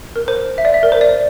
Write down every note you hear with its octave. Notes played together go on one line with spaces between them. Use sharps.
A#4
C5
E5
D5
E5
A#4
C5
D5